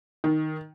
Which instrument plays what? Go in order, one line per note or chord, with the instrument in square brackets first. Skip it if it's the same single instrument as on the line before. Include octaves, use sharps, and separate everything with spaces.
[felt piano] D#3